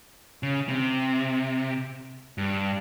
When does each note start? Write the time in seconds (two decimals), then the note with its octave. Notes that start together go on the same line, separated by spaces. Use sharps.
0.43 C#3
0.68 C3
2.38 G2